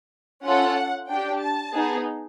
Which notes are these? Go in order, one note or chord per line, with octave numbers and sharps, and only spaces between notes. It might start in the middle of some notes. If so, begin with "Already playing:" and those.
C#4 F4 A4 F#5
D4 G4 G5
A5
B3 D#4 G#4